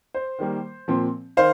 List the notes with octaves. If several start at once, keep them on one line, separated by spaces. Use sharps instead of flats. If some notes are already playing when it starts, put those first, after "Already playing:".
C5
D#3 G3 A#3
A#2 F3 C4
D#3 C5 F5